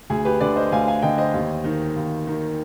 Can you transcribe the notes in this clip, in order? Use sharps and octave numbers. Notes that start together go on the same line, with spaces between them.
D2 G#4
G4 B4
D3 B4 D5
C5 D#5
D2 F5 G#5
F5 G#5
D3 D#5 G5
C5 D#5
D#2
D#3
D#2
D#3